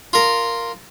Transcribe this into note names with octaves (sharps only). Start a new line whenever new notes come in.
F4 A#4